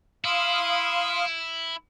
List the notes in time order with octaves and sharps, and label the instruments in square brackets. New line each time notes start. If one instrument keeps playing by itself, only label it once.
[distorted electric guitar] E4 [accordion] F5 C6 D#6